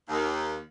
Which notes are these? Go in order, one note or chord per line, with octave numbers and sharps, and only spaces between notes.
D#2